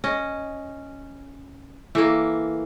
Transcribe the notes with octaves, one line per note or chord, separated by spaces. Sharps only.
C#4 D#5
E3 A3 A#3